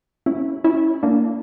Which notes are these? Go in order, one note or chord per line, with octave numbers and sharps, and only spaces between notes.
C#4 E4
C#4 E4
A#3 D4